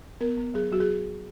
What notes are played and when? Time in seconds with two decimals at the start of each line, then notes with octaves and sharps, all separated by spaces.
0.20 B3 A#4
0.38 B3
0.54 F#3 G#4
0.71 F#3 F#4
0.80 G#4